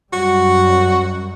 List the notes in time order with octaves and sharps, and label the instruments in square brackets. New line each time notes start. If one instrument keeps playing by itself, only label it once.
[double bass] F#2 G3 [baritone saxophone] F#4